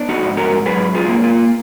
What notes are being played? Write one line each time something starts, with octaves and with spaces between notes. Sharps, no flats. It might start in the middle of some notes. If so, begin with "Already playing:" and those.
Already playing: B3 D4
D#4 F#4
G#2
F#4 A#4
F#3 G#4 B4
F4 G#4
A#3
F4